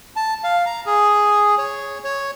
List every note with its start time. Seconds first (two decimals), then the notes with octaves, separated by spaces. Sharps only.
0.16 A5
0.44 F5
0.66 A#5
0.86 G#4
1.58 C#5
2.04 C#5